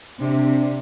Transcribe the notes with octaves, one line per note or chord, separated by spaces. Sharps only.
C3 D4